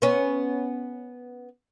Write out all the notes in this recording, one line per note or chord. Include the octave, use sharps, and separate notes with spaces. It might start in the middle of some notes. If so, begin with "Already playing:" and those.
B3 C#4